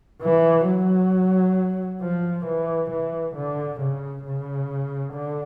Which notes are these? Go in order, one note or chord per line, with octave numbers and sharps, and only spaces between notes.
E3
F#3
F3
E3
E3
D3
C#3
C#3
D3